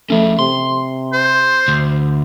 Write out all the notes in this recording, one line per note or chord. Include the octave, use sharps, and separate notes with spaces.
F3 A3 C#4
C3 C6
C5
D2